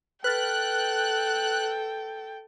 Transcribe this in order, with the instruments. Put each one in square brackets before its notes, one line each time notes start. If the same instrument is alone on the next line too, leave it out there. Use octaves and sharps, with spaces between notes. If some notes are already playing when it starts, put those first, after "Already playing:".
[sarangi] A4 [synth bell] B4 F6 A6 [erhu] G5 [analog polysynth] F#6